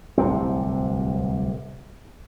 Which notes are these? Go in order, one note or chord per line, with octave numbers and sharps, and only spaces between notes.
D1 C2 C3 C4